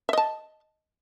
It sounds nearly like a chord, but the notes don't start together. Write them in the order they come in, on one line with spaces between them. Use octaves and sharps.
E5 D#5 A5